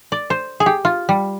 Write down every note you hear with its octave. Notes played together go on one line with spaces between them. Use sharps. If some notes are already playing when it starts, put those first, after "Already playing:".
D5
C5
G#4
G4
F4
G3